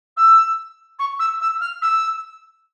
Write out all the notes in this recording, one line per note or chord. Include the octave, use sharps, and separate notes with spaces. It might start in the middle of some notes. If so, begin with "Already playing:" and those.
E6
C#6
E6
E6
F6
E6